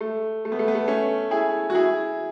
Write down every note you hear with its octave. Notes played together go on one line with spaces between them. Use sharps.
A3
A3
B3
A3
B3
A3
A3 C#4
E4 G#4
F#4
E4 G#4